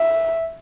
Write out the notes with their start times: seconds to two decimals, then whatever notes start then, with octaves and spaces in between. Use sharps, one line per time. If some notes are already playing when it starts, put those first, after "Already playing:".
Already playing: E5